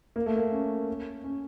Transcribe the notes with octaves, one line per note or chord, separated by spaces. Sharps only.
A#3
A3
A#3
C#4
C#4